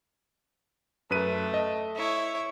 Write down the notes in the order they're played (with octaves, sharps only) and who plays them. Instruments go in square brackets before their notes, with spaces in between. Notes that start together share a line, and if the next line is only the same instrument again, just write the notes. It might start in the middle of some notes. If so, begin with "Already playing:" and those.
[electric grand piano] F#2 B4 D#7 [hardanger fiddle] A3
[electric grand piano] D#5
[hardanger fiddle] E4 C#5